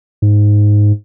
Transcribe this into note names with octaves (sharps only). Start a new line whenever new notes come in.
G#2